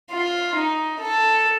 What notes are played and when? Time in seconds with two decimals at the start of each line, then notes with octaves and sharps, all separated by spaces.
0.11 F4
0.56 D#4
1.00 A4